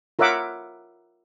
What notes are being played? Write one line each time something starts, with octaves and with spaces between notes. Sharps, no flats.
F4 A#4 C#5 E5 F#5 D6